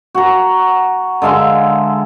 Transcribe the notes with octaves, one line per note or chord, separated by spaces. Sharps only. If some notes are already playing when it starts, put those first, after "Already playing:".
F#4 A#5
D3 G#3 E5 F5